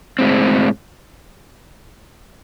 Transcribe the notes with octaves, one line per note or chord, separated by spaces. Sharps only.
A2 G#3 C4